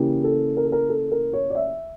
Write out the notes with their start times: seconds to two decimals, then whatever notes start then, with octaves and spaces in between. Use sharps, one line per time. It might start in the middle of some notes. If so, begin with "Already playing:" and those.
Already playing: C#3 E3 A#3 E4 G4
0.24 A4
0.57 A#4
0.65 A4
0.72 A#4
0.89 A4
1.12 A#4
1.33 C#5
1.50 D5
1.55 E5